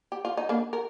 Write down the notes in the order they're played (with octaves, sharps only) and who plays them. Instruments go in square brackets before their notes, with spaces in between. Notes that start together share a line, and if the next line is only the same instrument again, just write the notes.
[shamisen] G4
F4
D#4
A#3 D4
A#4